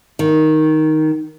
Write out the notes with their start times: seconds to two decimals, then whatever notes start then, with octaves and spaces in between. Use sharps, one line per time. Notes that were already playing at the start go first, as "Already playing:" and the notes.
0.19 D#3